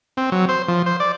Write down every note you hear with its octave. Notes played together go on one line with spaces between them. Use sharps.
C4
F#3
C5
F3
C5
D5